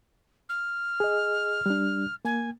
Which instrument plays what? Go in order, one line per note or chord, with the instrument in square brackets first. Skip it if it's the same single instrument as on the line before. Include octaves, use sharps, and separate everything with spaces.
[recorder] F6
[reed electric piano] G#4 D#5
G3 D4
[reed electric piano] A#3 [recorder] G#5